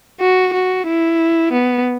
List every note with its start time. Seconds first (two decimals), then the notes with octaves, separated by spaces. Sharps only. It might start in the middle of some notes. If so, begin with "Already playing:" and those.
0.20 F#4
0.54 F#4
0.87 E4
1.53 B3